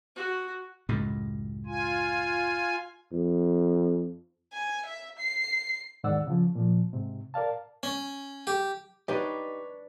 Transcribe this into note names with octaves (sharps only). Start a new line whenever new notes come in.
F#4
C#2 F#2 A2
F4 G#5
F2
G#5
E5
C7
E2 G#2 D#3 D5 F#5 E6
C#3 F3
A#2 F3
G#2 C3
A#4 D5 F5 A5
C#4
G4
D4 D#4 G4 B4 C#5